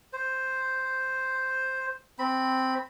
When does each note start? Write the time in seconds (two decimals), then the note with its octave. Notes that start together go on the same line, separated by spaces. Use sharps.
0.13 C5
2.19 C4 B5